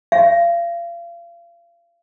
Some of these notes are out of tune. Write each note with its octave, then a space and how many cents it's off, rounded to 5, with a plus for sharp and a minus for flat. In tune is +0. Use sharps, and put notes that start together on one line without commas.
F5 -35